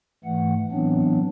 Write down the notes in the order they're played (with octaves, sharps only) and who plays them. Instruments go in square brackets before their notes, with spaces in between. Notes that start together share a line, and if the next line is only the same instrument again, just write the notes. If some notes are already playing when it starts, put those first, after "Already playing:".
[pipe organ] G#2 E3 A3 F#5
A2 E3 F#3 B3 C4 D4